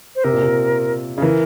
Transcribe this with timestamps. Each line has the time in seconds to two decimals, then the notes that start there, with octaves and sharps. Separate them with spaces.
0.16 C5
0.24 C3 A#4
0.33 A#2
0.43 C3
1.17 C#3 G#4
1.22 E3 A#4